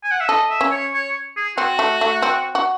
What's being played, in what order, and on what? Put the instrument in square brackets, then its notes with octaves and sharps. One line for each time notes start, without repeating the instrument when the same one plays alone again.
[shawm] G#5
F#5
E5
[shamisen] A4 [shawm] D#5
[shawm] E5
[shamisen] C#4
[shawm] C#5
C#5
G#4
[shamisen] C4 [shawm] F#4
[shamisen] A3
A3
C4
F#4